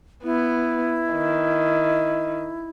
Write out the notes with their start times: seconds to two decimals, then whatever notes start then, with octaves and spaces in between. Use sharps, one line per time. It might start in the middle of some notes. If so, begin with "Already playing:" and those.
0.24 B3 E4
1.12 D#3